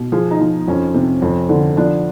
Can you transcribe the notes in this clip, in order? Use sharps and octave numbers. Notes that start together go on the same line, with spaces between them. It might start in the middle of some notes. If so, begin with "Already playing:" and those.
Already playing: B2
F3 G#4
D#4
F3
F2 C#4
C3
F2
D3
F3 D4